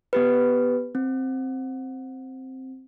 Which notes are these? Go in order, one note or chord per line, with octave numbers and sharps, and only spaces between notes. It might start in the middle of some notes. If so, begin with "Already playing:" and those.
B3 G4 B4
C4